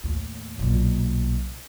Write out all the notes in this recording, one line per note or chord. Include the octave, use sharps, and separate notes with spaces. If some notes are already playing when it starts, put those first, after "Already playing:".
D#2 A2
B1 A#2